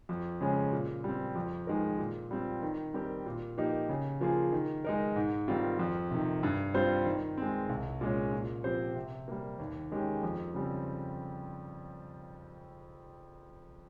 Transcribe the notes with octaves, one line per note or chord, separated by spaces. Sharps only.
F2
C#3 G#3 C#4
A#2
G3 C4
F2
D#3 G#3 D#4 A#4
A#2
G3 C4 F4
D#3
G3 C4 G4 A#4
A#2
F3 A#3 D#4 G4
C#3
F3 A#3 F4 G#4
D#3
G#3 D#4 A#4
G#2
D#3 G3 C4 F4
F2
C3 D#3
G2
G3 C4 F4 C5
D#3
G#3 C4
C2
A#2 G#3 C#4
A#2
F3 C4 G4 C5
C3
G3 A#3
D#2
D#3 G#3 C#4 G4
F2
C#3 G3 C4